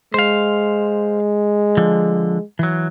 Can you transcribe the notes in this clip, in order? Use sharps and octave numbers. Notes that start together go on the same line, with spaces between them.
G#3 C5 F5
D3 F3
E3 F#3